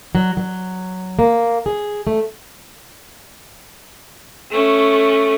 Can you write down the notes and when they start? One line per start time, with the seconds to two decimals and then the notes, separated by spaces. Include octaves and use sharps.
0.15 F#3
0.37 F#3
1.19 A#3
1.66 G#4
2.07 A3
4.51 A3 C#4